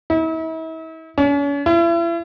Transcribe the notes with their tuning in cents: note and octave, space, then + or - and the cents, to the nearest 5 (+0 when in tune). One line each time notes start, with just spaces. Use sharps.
E4 -40
C#4 +40
E4 +40